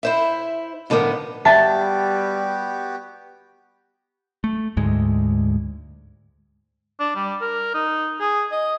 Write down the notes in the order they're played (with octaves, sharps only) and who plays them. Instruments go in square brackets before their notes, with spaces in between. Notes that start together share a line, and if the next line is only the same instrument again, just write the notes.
[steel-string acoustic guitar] E4 C5 E5
A2 D3 F3 B3 A#4
[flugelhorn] G3 [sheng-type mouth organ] B3 F#4 G4 [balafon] E5 [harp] A5
[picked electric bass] A3
D2 G#2 G#3
[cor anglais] D4
G3
A#4
D#4
G#4
D#5